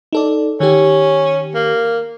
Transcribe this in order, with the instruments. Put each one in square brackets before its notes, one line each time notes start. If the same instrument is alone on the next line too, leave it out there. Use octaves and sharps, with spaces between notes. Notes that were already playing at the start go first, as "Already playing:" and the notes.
[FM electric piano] D#4 A4 D5
[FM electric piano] D#3 G4 [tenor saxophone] C#4
[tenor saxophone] A#3